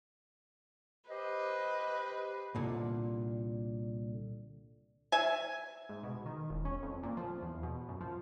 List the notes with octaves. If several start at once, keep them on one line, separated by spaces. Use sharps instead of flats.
G4 B4 C5 D#5
C2 A#2 D3
E5 G#5
G#2
B2
D#3
E1
C#4
F2
A#2
F3
E2
B2
F#2
F3